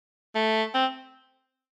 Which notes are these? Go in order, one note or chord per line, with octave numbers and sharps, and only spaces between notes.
A3
C4